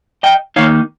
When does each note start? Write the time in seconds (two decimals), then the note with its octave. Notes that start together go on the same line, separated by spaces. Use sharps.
0.23 D#5 G5
0.56 D#3 A#3 D#4 C#5 F5